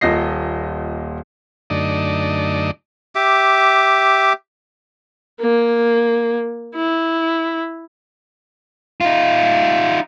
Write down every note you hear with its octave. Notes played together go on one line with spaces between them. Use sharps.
D#1 A#2 D#5 A#6 C7
F#2 D3 A3 D#4 D5 D#5
G4 E5 D6
A#3
E4
D#4 F4